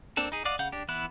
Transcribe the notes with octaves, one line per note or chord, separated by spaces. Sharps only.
A#3 C4 D4 A4
D#4 G#4
D5 D#5 F5 F#5 D6
C#3 F5 F#5 G6
D4 G4
E3 B3 E4 F#6